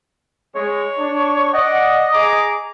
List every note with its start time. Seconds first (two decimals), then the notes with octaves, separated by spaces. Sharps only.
0.55 G#3 C#5
0.98 D4
1.54 D5 D#5 F#5
2.14 G#4 A#5 D6